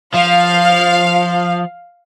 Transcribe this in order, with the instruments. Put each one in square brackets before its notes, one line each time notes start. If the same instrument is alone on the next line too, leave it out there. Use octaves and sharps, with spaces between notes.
[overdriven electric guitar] F3 [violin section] F5